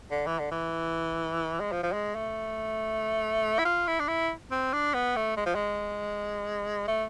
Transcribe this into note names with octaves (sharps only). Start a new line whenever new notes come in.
D3
E3
D3
E3
G#3
F3
F3
G#3
A3
E4
F4
E4
D4
E4
C4
D4
B3
A3
G#3
F3
G#3
A3